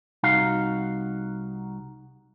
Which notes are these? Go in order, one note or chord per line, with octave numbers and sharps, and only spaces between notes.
C2 D#4 F#4 F5